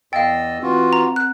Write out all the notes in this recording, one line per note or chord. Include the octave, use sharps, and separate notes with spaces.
E2 D#5 F5 G5 E6 A6
E3 C4 F4 F#4 F#5
A#5
F#6